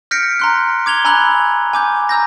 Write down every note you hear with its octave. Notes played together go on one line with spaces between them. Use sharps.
F6 G6 A#6 B6 C#7 D7
A#5 C6 F#6
D6 G#6 F7 G7
G#5 A#5 B5 E6 F#6 F#7
G#5 D6 G6
A#5 E6 G6 A#6